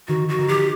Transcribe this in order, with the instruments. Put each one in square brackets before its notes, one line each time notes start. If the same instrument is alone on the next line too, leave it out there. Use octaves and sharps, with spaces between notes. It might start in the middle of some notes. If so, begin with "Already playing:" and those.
[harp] D#3 [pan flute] F#4
[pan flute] F#4
[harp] D#3
[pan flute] G4